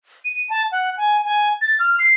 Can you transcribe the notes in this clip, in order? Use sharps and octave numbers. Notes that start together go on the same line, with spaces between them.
D#7
A5
F#5
G#5
G#5
A6
F6
C7